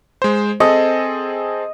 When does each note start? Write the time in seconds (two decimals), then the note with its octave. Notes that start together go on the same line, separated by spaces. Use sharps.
0.22 G#3 C5
0.60 C4 G#4 A4 D#5